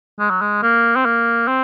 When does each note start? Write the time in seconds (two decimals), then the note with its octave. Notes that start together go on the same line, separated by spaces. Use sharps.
0.19 G#3
0.30 F#3
0.42 G#3
0.63 A#3
0.96 C4
1.05 A#3
1.48 C4